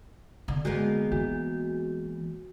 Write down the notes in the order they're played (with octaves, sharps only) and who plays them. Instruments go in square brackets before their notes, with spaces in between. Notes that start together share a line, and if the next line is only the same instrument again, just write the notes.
[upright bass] D3
[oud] G#3 A#3 B3 [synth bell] F#4
[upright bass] E3 [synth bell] F#4